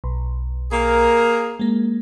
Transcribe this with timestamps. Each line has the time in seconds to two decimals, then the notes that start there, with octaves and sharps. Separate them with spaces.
0.04 B1
0.72 A#3 G#4 A#4
1.59 G#3 A#3